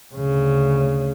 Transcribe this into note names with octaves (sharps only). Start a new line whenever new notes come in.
D2 C#3